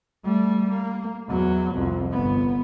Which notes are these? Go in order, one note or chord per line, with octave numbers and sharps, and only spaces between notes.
G3 A3
A#3
E2 F#3
C2 F2
G1 B3